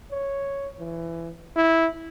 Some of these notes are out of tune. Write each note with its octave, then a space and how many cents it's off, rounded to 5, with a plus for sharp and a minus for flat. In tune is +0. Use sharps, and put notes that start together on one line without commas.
C#5 +0
E3 +20
E4 -10